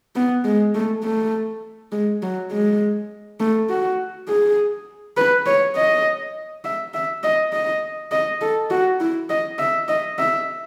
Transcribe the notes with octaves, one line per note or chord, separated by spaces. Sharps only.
B3
G#3
A3
A3
G#3
F#3
G#3
A3
F#4
G#4
B4
C#5
D#5
E5
E5
D#5
D#5
D#5
A4
F#4
E4
D#5
E5
D#5
E5